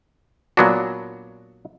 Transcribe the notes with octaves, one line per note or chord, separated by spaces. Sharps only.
A#2 F#3 B3 D4 F#4